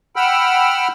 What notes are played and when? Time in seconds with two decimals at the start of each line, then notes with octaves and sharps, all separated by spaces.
0.16 F#5 G5 B5 E6 F6